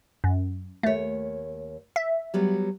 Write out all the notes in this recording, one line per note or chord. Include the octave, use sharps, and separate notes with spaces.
F#2
D#2 A3 C#5
E5
F#3 G3 B3